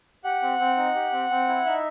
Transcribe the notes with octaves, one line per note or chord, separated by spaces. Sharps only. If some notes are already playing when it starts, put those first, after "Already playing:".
G4 F#5
C4
C4
D#4
G4
C4
C4
E4
D#4 E5